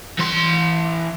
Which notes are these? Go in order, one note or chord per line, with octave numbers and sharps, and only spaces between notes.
E3 C6